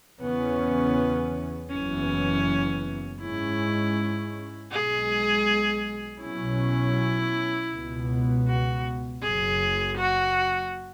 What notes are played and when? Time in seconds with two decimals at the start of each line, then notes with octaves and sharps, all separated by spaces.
0.20 E2 C#3 E3 B3 C#4
1.70 F#1 F#2 E3 B3 C#4
3.20 G#2 G#3 C#4 E4
4.71 B1 B2 G#3 G#4
6.21 B1 B2 F#3 C#4 E4
7.72 C#2 B2 B3
8.48 F#4
9.22 F#1 F#2 F#3 G#4
9.97 F#4